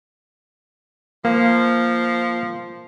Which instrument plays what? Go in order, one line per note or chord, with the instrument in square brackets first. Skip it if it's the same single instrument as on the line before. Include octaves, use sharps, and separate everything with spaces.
[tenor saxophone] F3 [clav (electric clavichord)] A#3